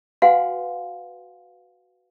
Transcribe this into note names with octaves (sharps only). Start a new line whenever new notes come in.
F#4 B4 F5 F#5 G#5 C6